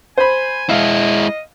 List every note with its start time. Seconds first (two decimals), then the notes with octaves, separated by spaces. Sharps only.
0.18 C5 G#5 B5
0.69 G#3 E4 D#5 F5